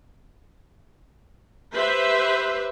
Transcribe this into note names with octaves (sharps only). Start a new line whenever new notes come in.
G4 B4 C5 E5